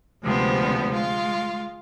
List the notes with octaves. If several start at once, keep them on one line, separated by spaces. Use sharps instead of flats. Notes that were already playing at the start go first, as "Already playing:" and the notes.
D2 C3 F3 G#3 B3
G#3 F4